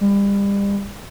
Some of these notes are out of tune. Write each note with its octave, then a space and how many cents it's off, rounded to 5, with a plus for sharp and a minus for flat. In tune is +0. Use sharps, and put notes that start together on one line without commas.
G3 +35